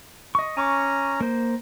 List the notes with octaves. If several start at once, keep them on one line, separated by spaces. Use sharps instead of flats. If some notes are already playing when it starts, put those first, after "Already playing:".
D#5 C#6
C#4 G#5 A#5 C#6 D6
A#3 C5